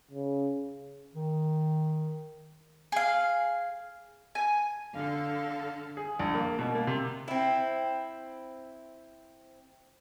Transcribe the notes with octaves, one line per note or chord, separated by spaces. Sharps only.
C#3
D#3
G#4 F5
G#5
D3 A4 F5
G#4
A#1
A#3
B2
A#3
C3
C4 E4